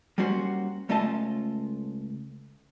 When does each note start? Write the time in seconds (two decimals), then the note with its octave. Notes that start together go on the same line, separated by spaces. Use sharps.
0.18 G3 A#3 C#4 F#4 C5
0.89 C#2 A3 C#4 F4 D#5 A5